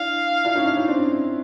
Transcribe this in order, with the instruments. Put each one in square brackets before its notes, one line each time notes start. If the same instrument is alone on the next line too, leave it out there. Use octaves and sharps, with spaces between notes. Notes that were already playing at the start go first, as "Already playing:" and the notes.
Already playing: [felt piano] D4 E4 [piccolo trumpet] F5
[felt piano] D4 E4
C#4 D#4
D4 E4
C#4 D#4
C4 D4